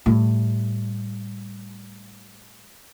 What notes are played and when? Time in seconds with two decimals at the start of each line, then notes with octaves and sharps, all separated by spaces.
0.06 A2 G3